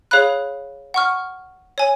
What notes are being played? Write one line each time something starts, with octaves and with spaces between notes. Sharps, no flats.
G#4 C#5 F5 B5 F#6
F#5 C#6 F6
C#5 G#5